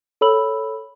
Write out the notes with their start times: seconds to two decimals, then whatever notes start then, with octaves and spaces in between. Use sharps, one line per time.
0.21 A4 C#5 B5 E6 F#7